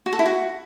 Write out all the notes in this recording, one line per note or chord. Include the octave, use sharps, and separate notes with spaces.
F#4
A4
E4
F#4